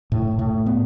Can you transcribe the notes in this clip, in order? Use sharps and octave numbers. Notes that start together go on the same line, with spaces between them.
A2
A2
B3